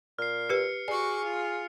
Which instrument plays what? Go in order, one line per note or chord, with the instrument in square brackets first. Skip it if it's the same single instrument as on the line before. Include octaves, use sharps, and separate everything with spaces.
[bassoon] A#2 [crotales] F6 C7
[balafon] G4 B4 [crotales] C#7
[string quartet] F#4 C#6 D6 [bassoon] G#4 [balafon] D5
[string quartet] F4